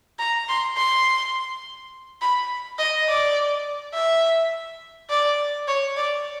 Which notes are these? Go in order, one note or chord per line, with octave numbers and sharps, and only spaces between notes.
A#5
C6
C6
B5
D#5
D5
E5
D5
C#5
D5